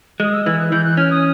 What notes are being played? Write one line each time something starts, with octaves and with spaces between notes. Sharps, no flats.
G#3 D#6
E6
E3 E6
F#6
E3 G6
F#6
C#4 F6
D#6